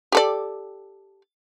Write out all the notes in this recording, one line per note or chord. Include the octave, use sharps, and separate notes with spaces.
G4 A4 D5